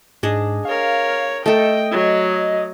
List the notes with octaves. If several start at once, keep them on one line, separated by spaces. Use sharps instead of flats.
G#2 D4 G#4 D#5
A#4 C#5 F5
A3 A4 D#5 G5
F#3